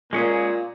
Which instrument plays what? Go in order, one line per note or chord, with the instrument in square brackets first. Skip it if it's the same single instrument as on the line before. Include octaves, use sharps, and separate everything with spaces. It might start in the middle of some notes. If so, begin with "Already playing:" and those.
[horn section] A#2 [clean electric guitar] G#3 C#4 G#4